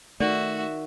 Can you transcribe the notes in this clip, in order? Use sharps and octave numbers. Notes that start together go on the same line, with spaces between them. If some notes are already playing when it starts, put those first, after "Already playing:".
D#3 A3 F#4 D5 E5